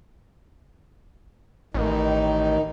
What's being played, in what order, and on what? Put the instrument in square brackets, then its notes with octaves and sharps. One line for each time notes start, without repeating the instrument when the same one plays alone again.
[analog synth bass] A1 [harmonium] D#3 D#4